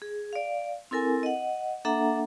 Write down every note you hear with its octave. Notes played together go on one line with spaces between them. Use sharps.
G#4
D5 F5
C4 E4 A4 A#4 G#5
D#5 F#5
A#3 D4 A4 E5 F#5 A#5